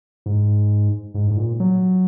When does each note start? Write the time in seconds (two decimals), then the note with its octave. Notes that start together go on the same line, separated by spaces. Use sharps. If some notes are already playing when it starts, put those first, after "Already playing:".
0.26 G#2
1.14 G#2
1.31 G#2
1.37 A#2
1.60 F#3